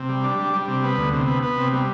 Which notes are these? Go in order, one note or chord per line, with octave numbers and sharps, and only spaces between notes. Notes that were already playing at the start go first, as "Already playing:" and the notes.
Already playing: C3
G3
D4
G3
G3
C3
B3
D2
C3
B3
B3
C3
G3